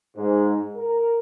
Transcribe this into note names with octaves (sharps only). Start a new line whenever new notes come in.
G#2
A#4